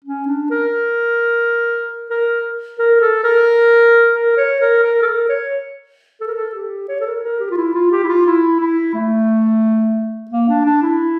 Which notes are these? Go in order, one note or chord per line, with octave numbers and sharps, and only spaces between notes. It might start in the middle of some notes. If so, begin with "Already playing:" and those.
C#4
D4
A#4
A#4
A#4
A4
A#4
A#4
C#5
A#4
A#4
A4
A#4
C#5
A4
A#4
A4
G4
C#5
A4
A#4
A#4
G4
F4
E4
F4
G4
E4
F4
E4
E4
A3
A#3
D4
D4
E4